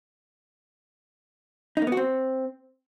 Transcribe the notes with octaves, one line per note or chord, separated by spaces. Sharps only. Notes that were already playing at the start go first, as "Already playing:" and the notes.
D#4
A#3
B3
F#4
C4